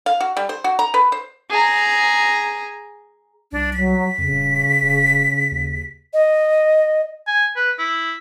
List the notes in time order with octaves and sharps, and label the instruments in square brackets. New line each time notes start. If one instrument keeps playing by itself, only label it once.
[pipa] F5
F#4
G3
C5
F#4
A#5
B4
C5
[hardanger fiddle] G#4 A#5
[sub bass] C2 [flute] D4
[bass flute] F#3 [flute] B6
[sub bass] F2 [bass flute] C#3
[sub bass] D#1
E1
D#2
[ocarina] D#5
[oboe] G#5
B4
E4